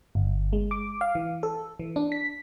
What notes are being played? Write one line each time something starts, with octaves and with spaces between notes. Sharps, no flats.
G1
G#3
D6
F5
E3
A4
E3
D4
B6